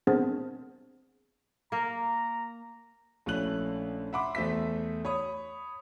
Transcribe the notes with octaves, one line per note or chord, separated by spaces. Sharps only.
B3 C4 D4 G#4 A#4 C5
A#3 A#4 A#5
A#1 A3 C#4 E4 F#6 F#7
E5 F#5 B5 C6 D6
E2 A3 C5 E5 B6
C#5 B5 D#6